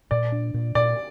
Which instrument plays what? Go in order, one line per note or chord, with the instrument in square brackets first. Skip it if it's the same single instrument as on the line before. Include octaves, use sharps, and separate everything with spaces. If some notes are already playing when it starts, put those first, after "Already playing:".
[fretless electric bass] A#2 [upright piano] D5
[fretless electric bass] D4
A#2
[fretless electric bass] A#2 [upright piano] D5